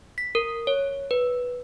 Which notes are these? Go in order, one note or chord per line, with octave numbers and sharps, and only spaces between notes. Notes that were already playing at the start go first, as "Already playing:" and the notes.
B6
A#4
C#5
B4